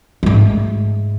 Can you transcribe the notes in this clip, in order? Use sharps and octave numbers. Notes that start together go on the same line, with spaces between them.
G#2 A3